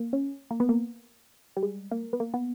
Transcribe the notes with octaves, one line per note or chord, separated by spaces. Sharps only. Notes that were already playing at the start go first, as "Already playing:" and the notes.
Already playing: A#3
C#4
A#3
B3
A#3
G3
G#3
A#3
B3
A#3
B3